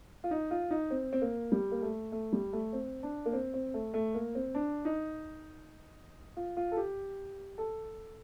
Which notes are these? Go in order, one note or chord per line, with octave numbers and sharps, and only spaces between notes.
F4
D#4
F4
D#4
C4
C4
A#3
G3
A#3
A3
A3
G3
A3
C4
D4
A#3
C4
C4
A3
A3
A#3
C4
D4
D#4
F4
F4
A4
G4
A4